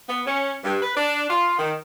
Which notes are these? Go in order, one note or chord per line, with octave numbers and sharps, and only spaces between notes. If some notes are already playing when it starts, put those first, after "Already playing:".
B3
C#4
G2
B4
D4
F4
D#3